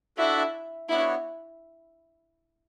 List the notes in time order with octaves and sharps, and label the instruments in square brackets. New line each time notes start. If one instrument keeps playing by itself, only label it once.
[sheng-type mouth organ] D4 F#4 A4 E5 [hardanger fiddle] E4
[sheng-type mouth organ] B3 D4 F#4 C#5 [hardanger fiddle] E4